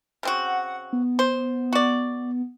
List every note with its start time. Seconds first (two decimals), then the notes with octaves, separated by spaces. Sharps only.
0.23 C#3 C4 F#4
0.44 F#5
0.93 B3
1.19 C5
1.73 F#4 D5